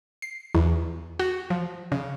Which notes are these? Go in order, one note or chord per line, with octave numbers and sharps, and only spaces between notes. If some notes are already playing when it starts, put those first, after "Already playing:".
C7
E2
F#4
F3
C#3